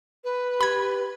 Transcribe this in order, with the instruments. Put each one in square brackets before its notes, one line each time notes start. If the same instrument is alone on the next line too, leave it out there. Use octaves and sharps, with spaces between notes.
[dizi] B4
[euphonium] G4 [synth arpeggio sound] B5 G#6